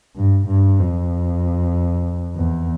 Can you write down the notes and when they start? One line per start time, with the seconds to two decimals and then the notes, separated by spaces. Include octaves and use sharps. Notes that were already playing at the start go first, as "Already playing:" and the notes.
0.16 G2
0.47 G2
0.79 F2
2.36 E2